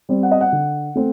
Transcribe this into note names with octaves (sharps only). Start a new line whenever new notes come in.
G3 C4
F#5
D#5
F#5
D3
A3 C4